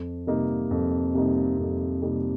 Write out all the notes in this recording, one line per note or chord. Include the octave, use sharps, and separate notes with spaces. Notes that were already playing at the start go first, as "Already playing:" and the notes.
Already playing: F2
C3 G3 A#3 D#4
F2
C3 G3 A#3 D#4
F2
C3 G3 A#3 D#4